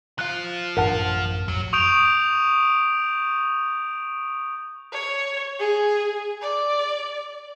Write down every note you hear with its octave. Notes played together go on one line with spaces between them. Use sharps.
F3 F4 F#6
A1 F#2 D4 A#4 F#5 A5
F2 F#3
C#6 D#6 G6 D7 F7
C#5
G#4
D5